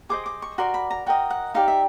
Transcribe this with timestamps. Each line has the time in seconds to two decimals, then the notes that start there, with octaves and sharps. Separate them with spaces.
0.09 G#4 C5 D#5 D6
0.26 D6
0.42 C#6
0.58 F#4 A#4 D5 C6
0.74 B5
0.91 A#5
1.06 F#4 A#4 D#5 G5
1.30 F#5
1.54 D#4 G4 B4 D5 F5
1.68 E5